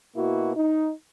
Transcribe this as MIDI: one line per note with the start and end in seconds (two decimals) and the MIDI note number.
0.17 0.52 47
0.17 0.52 58
0.17 0.52 64
0.17 0.52 66
0.56 0.91 63